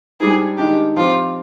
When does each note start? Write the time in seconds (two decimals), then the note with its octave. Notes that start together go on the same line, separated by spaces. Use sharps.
0.20 G#2 G3 D4 G#4
0.58 D#3 G#3 D4 G4
0.96 F3 C4 F4 G4